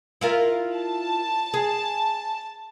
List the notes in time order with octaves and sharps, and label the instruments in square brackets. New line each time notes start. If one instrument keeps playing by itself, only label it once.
[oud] E4 F4 A#4
[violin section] A5
[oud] G#4